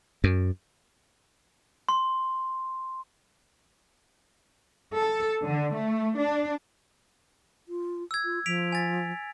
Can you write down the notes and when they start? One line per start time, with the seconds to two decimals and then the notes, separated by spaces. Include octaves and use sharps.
0.24 F#2
1.89 C6
4.97 A4
5.43 D3
5.74 A3
6.17 D4
7.68 F4
8.11 E6 G#6
8.24 F4
8.46 F3 B6 D7 F7
8.72 G#5 A6 B6